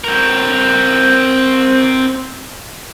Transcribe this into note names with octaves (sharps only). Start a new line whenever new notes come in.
C4 A#4